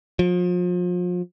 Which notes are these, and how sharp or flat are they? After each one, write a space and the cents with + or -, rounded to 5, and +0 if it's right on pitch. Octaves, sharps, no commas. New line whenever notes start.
F3 +35